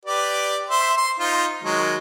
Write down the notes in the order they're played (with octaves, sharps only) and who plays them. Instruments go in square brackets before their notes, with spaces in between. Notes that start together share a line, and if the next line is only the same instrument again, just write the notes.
[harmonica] G4 B4 D5
C5 E5
C6
D#4 F4 C5
D#3 F#3 G#3